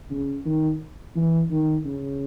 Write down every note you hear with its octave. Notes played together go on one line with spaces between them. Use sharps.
C#3
D#3
E3
D#3
C#3